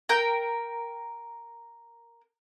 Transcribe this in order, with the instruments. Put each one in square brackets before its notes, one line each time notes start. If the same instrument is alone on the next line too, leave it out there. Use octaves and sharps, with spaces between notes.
[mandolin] A#4 G5 G6